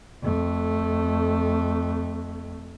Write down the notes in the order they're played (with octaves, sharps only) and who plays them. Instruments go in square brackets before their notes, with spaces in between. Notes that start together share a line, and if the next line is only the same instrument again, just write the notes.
[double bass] F2 A3